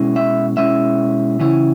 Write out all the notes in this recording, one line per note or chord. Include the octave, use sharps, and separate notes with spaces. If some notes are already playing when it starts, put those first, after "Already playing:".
Already playing: B2 G#3 C#4 E4
E5
B2 G#3 C#4 E4 E5
C#3 E3 C#4 E4